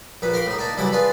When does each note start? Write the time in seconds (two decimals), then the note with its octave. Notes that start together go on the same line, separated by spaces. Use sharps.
0.22 A#1 A#2 B4
0.33 A#4 F5 B5 C6 D6
0.46 A2 D#4
0.58 A#3 D4 D#4
0.77 C2 E3 F#3 E4 B5 D6
0.92 D4 F4 G#4 B4